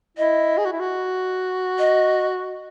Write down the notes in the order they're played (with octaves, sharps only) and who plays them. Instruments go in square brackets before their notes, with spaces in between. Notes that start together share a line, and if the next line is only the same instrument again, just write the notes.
[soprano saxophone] E4 [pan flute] D#5
[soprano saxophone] G#4
F#4
E4
F#4
[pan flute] D#5